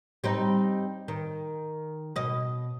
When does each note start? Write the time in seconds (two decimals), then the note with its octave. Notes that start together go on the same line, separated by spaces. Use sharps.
0.24 G3 C4 D#4
1.08 D#3
2.16 B2 D#5